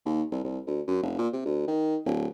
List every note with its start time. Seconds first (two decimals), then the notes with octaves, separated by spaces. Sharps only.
0.06 D#2
0.32 C2
0.44 C2
0.67 D2
0.87 F#2
1.03 F1
1.18 A#2
1.33 C3
1.46 D2
1.67 D#3
2.06 D1